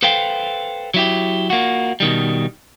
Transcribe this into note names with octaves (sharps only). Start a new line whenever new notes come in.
A4 B4 C5 F5 G5
F#3 E4 G4
A#3 F4 F#4
B2 D#3 G3